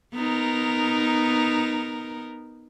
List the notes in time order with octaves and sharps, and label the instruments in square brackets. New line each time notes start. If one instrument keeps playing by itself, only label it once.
[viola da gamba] B3 D#4 A#4